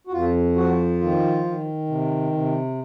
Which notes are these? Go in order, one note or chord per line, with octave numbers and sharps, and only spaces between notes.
F#4
F2 F4
F3 F#4
D#3 F4
D#3
C3
C3